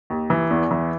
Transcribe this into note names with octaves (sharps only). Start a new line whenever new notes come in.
D#2
E3
E2
E3